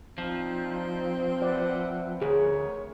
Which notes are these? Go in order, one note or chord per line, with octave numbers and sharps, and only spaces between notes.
F3 C4 D4 D#4 F4
B4 D5 E5 F#5
D2 G#4 A#4 C#5